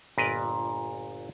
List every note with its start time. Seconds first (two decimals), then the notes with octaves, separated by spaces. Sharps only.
0.18 G1 A#2 A#4 B4 D5 D#5